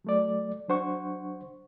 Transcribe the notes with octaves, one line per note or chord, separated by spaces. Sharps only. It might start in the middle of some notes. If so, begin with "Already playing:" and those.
F#3 A3 D5
F#3 D4 C5 F#5 C#6